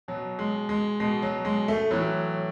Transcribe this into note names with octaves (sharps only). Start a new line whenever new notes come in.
B2 F#3
G#3
G#3
B2 G#3
F#3
G#3
A3
A2 E3 F#3